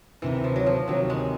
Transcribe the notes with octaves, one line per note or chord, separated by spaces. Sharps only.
D2 C3 D#3 E3
F3
F#3
F3
D2 C3 D#3 F#3
G#3